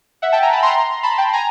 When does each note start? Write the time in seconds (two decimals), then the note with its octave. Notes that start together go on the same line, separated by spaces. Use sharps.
0.22 E5 F#5
0.32 G5 A5
0.42 G#5 A#5
0.53 A5 B5
0.62 A#5 C6
1.03 A5 B5
1.18 G5 A5
1.33 G#5 A#5